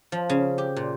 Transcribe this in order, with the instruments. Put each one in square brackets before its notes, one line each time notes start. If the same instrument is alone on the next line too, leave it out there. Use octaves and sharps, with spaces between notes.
[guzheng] F3
C#3
G4
A#2